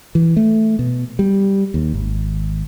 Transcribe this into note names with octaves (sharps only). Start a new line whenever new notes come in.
E3
A3
B2
G3
D#2
G#1